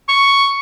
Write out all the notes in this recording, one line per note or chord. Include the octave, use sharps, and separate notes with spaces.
C#6